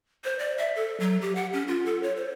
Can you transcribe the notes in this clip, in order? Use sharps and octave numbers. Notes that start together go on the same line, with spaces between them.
C5
D5
E5
A4
F#3
G4
F#5
C#4
F4
A4
C#5
C5